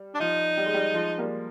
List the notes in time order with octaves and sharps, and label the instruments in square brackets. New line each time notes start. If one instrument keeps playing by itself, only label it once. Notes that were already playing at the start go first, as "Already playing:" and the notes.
Already playing: [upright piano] G3
[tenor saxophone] D4
[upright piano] F3 [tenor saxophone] D#4
[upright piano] G3
G#3
G3
F3 G#3
G3 A#3